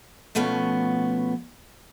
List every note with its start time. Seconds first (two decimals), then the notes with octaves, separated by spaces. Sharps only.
0.35 B2 F3 A3 B3 C#4